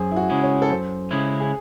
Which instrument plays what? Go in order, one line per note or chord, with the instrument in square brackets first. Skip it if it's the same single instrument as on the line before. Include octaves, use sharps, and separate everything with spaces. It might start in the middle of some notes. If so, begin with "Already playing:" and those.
Already playing: [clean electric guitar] F#2 [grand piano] G#4 C5
[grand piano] E4
F#4
[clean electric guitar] C#3 G#3 C#4 E4
[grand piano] C#5
A4
[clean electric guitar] F#2 [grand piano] C5
[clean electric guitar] C#3 G#3 C#4 E4
[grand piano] G#4